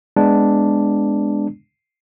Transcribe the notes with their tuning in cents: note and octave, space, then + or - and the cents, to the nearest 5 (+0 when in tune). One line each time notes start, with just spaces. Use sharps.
G#3 +0 B3 +20 D4 +0